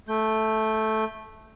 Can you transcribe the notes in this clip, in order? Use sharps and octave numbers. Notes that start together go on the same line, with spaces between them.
A3 G6